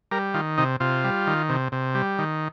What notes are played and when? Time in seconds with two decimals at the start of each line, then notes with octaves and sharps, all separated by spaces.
0.11 G3 A#4
0.34 D#3 F4
0.58 C3 D#4
0.80 C3 F4
1.04 G3
1.27 D#3
1.49 C3
1.72 C3
1.95 G3
2.19 D#3